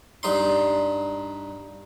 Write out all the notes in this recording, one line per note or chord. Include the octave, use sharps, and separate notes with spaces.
G2 D#4 C6